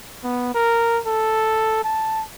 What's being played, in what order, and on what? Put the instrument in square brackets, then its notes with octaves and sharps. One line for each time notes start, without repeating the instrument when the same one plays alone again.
[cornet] B3
A#4
A4
A5